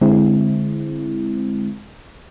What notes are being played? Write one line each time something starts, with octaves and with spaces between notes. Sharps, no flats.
D3 G#3 C4 E4